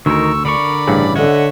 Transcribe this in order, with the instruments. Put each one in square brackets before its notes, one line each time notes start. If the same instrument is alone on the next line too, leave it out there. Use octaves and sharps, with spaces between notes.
[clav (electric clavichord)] D2 [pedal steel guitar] D#3 D#4 A#4 [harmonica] C#6 E6
[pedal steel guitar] D3 A#4 C#6 [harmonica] D5 B5
[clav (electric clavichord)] A1 G2 C#3
[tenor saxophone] D3 [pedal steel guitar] C#5 [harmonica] D#5 E5 F#5